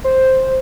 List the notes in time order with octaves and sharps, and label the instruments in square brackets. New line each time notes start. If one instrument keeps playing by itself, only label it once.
[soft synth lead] C5